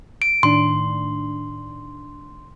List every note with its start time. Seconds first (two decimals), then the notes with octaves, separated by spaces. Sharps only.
0.22 D7
0.43 A2 D#3 D4 C6